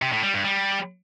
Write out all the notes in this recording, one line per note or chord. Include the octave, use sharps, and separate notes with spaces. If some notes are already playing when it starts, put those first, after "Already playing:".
C3
A2
G3
G2
G3